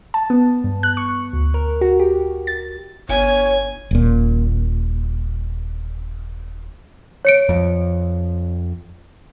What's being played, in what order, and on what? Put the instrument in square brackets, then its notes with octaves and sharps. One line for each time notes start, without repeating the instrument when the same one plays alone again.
[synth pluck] A5
B3
G2
F#6
C#6
D2
A#4
F#4
G4
A6
[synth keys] G1 [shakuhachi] C#5 [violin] G#5
[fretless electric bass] D#1 A#2
[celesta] C#5 C#7 D7
[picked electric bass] F2